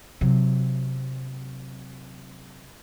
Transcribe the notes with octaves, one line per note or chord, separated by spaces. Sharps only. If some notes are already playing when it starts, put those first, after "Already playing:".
C3 F#3